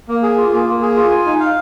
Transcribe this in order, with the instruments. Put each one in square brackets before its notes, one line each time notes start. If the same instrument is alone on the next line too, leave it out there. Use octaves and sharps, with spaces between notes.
[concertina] A#3
G#4
F4
A#3
A#3
G#4
F4
G#5
D#4
F5